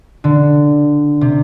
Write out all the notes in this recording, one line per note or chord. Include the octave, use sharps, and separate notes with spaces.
D3
C3